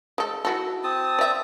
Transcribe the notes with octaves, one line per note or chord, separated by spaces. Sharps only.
G#3 A4
E4 F#4 A4
C4 A5 D#6
D5 E5